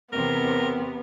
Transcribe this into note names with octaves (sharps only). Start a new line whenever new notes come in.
E2 C3 B3 A#4